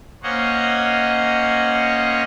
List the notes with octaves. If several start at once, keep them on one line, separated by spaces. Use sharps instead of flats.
A#3 C#4 C5 C#5 D#5 F#5